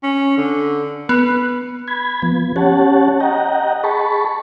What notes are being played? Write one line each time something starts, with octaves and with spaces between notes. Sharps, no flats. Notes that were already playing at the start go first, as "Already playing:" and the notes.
C#4
D3
B3 B4
B5 G#6
F3 B3
C#4 G4 C#5 F#5 A5
D#5 F#5 G5 A#5
G#4 A5 B5 C#6